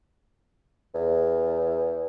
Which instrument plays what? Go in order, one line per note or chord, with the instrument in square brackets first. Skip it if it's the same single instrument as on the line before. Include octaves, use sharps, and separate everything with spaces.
[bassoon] E2